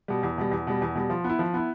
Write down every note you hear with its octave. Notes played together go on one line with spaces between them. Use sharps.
B2 G3
E2
B2 G3
E2
B2 G3
E2
B2 G3
F3
B3
E4
F3
B3 E4